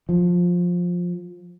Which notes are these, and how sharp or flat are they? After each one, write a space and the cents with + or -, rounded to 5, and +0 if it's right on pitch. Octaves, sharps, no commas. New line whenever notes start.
F3 +15